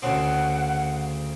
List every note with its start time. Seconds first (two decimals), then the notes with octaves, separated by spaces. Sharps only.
0.02 D2 C#3 C4 F#5